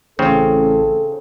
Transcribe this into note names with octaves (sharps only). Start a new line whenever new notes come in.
A1 C#3 C4 A4